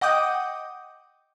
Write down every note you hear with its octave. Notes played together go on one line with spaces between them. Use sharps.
D#5 F#5 G5 D6 D#6 G6